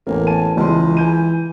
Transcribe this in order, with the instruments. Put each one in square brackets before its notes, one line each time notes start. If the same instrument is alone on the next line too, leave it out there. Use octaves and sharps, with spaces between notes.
[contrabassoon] A1 [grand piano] E2 A#3
[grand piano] G#5 A5 D#7
[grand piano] C#2 G#3 C6 [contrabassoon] E3
[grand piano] G#5 G6 D#7